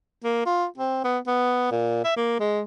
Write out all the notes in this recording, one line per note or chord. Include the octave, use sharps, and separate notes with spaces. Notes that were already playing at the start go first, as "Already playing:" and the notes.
A#3
F4
C4
B3
B3
A#2
E5
A#3
G#3